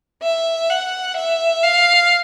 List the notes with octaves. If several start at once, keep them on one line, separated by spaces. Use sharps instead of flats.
E5
F#5
E5
F5